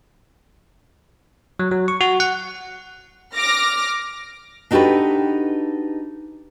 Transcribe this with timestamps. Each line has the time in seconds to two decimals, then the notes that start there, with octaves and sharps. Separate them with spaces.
1.59 F#3
1.72 F#3
1.88 C#6
2.01 F#4
2.20 F#5
3.36 D6 F6 A#6
4.71 D4 D#4 F#4 G4 A4 B4